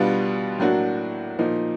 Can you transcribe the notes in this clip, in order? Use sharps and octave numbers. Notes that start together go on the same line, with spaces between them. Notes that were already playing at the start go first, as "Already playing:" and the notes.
Already playing: B2 G3 B3 D4 F4
A2 F#3 A#3 D4 F#4
A#2 F3 A#3 D#4